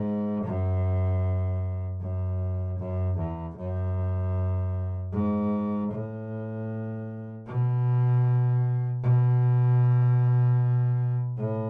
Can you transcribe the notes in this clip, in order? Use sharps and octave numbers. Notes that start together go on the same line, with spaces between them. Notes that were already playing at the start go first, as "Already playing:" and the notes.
Already playing: G#2
F#2
F#2
F#2
E2
F#2
G#2
A2
B2
B2
A2